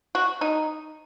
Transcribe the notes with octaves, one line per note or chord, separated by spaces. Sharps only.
F#4
D#4